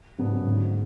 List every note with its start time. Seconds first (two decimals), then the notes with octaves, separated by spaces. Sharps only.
0.18 G#2 C#3 F#3 B3 D4
0.46 D2 G#2